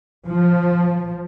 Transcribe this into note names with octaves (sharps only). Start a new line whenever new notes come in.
F3